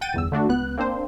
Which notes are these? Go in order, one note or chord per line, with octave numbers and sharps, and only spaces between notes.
F#5 G5 G6 A6 D#7
G1 E2 E6
D3 A3 D4 F#4
C#2 B3 F#6
A#3 C4 D4 C5